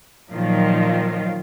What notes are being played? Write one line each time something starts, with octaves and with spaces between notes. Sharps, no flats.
A#2 D#3 F3 F#3 F4